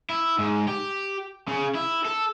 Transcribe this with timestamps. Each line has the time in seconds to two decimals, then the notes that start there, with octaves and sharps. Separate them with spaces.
0.10 E4
0.38 G#2
0.68 G4
1.48 C#3
1.75 E4
2.05 A4